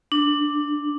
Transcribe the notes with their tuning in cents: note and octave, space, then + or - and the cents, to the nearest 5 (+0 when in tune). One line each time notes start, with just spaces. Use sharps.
D4 +0